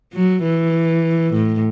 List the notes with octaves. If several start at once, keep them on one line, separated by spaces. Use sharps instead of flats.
F#3
E3
A2